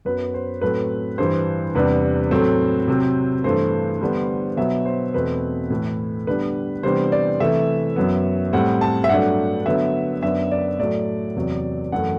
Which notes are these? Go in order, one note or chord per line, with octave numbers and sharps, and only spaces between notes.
F#2 F#3 B3 B4
C5
A2 F#3 A3 C4 B4
G2 E3 G3 C5
E2 C3 G3 B3 D4 B4
A2 F#3 A3 C4
C3 F#3 C4
G2 E3 A3 C5
D3 G3 B3 D4
B2 F#3 B3 E5
C5
E2 B2 A3 C4 B4
A2 E3 A3
D3 G3 B3 D4 B4
C3 E3 G3 B3 D4 C5
D5
C3 E3 A3 E5
F#2 F#3 B3
A2 G3 C4 F#5
A5
E5
G2 F#3 A3 D4 F#5
D3 F#3 B3 E5
F#2 F#3 B3 D4 E5
D5
A2 F#3 A3 D5
E2 C3 F#3
F#2 E3 A3 F#5